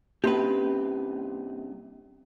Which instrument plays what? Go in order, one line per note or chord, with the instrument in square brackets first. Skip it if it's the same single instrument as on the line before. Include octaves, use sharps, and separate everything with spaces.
[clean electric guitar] G2 C3 [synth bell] A#3 C#4 [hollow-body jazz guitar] G4 B4